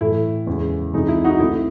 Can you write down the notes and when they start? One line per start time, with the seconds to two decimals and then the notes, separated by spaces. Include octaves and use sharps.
0.01 A2 E3 A3 E4
0.47 E2 C#3 G#3
0.94 C2 C3 E3 G#3 D#4
1.09 E4
1.24 D#4 F#4
1.40 C2 C3 D#3 A3 E4